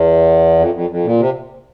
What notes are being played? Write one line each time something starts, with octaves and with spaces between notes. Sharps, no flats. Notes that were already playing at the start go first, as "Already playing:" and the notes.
Already playing: E2
F2
F2
F2
A#2
C3